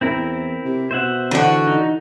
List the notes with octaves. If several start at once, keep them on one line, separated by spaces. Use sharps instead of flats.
E2 C4 E4 A#4
C3
B2 C5 E5 F#5
D3 E3 F#4
D#4